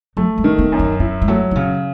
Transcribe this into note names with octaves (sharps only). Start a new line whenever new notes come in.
F#3 A3
G#3
D#3
B3
F#2
C#4
C#4 E4
G#3
F#3 A3
D#4
C#3 C#4